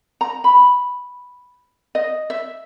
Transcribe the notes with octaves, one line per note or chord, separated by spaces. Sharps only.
A#5
B5
D#5
E5